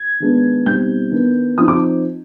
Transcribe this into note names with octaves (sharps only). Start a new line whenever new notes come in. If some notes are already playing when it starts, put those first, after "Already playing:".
Already playing: G#6
D#3 G#3 B3 D4
B2 G3 C4 D#4 G6
D#3 B3 D4
F3 C4 D#4 D#6
D6